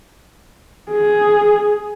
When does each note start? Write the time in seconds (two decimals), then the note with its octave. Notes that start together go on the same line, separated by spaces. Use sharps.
0.92 G#4